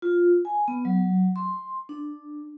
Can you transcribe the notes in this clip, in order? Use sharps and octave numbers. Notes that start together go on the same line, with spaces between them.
F4
G#5
B3
F#3
C6
D4